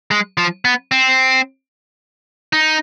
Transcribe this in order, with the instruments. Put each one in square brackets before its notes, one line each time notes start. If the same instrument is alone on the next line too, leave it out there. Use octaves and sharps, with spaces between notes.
[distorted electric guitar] G#3
F3
B3
C4
D#4